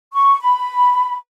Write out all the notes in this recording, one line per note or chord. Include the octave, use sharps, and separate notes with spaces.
C#6
B5